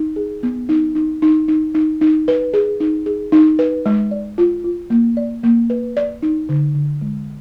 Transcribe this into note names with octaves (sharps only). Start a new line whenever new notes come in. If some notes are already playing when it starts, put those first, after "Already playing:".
Already playing: D#4
G#4
B3
D#4
D#4
D#4
D#4
D#4
D#4
B4
G#4
D#4
G#4
D#4
B4
G#3
D5
F4
F4
A#3
D5
A#3
B4
D5
D#4
D3
D3
G#3